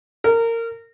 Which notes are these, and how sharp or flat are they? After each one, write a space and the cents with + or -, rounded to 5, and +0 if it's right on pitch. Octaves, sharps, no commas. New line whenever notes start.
A#4 -20